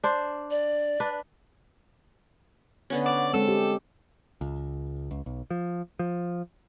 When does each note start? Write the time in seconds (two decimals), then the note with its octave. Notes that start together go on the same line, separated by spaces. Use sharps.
0.04 D4 C5
0.51 D5
1.00 D4 B4
2.90 D3 B3 C#4
3.06 D5
3.33 G#3 C4 A4
3.48 G4
4.41 C#2
5.11 C#2
5.26 B1
5.51 F3
5.99 F3